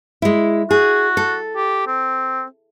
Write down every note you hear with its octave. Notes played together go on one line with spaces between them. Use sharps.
G#3 E4
F#4 G#4
A4
G4
C4